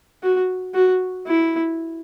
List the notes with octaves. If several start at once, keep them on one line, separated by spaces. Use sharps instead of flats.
F#4
F#4
E4